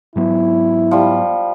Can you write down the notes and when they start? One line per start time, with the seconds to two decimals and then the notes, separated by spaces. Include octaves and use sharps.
0.16 G#2 F#3 B3 E4
0.91 F3 G3